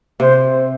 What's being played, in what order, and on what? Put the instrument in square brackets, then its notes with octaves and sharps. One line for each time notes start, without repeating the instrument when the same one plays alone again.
[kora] C3 [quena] C5